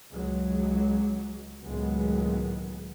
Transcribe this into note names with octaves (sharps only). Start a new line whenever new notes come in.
C#2 F#3 G#3
C#2 A2 D#3 F#3 G#3 B3